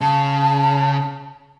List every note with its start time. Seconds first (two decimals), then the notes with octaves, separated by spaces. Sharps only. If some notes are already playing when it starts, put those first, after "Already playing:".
0.01 C#3 A5